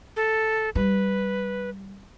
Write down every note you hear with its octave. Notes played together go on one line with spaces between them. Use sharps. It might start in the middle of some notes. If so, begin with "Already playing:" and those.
A4
G3 B4